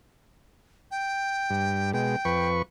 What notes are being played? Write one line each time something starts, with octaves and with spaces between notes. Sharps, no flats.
G5
G2
B2 G#3 G5
F2 B4 C#6